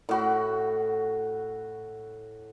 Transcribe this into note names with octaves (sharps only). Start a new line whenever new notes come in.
A2 F#4 B5